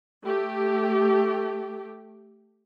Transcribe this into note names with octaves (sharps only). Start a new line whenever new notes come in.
A3 G4